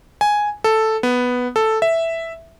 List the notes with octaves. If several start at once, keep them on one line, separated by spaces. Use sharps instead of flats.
G#5
A4
B3
A4
E5